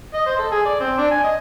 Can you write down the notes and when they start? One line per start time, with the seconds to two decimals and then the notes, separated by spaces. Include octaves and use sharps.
0.14 D#5
0.26 C5
0.39 A4
0.51 G#4
0.65 D5
0.80 C4
0.98 D4
1.11 G#5
1.24 D#5